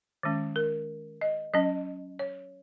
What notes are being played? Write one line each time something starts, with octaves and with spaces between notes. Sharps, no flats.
D#3 G#3 C#4
A#4
D#5
F#3 C#4 D#5
C#5